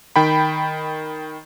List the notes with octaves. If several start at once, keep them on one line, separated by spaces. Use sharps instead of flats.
D#3 G5 B5